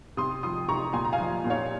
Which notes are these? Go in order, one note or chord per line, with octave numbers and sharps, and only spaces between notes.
C3 C6 D#6
F3 C6 D#6
C3 A#5 C#6
A#2 G#5 C6
A#5
F5 G#5
F3
A#2
C#5 F5